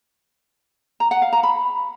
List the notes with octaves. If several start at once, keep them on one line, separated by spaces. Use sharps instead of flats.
A#5
F#5
F5
A#5
B5